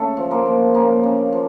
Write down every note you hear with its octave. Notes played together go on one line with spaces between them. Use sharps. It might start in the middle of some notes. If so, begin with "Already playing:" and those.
Already playing: C#3 A3 A4
F3
A#3 A#4
F3
C#3 A#3 A#4
C#3
F3